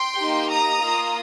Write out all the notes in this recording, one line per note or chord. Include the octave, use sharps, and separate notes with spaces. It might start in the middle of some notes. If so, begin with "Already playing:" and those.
Already playing: G5 C6
A#3 D#4 G4
A#5 D#6
A#3 F4